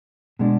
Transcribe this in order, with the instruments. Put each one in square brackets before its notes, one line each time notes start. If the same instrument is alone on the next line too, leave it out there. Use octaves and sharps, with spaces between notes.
[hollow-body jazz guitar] B2 G#3 D4